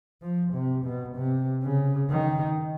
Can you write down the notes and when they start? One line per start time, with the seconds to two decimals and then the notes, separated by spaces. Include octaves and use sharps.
0.21 F3
0.53 C3
0.84 B2
1.16 C3
1.63 C#3
2.10 D#3